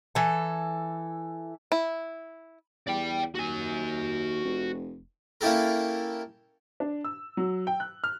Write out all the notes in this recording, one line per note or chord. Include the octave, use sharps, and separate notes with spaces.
E3 A4
E4
E2 D5 G5
D#2 F#4 G#5
F1
A#3 C#4 E4 G4 A4 A#4
D4
E6
F#3
G5
F#6
F6